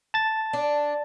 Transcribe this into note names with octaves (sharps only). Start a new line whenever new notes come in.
A5 A6
D4